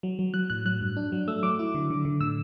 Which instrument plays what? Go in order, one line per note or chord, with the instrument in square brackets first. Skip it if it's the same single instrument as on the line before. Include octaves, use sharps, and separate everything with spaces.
[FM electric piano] F#3
F#3
F#3 F#6
A2 F#6
F#3 F#6
G2
D4
F#3
A3 E6
F#3 D6
E4
D3
D3
D3
A2 E6